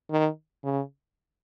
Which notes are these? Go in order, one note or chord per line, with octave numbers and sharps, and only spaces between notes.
D#3
C#3